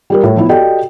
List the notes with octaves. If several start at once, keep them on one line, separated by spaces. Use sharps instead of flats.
G3 G4 A#4
A2
F3 B3 E4
F#4 G4 A4 D5 D#5 G5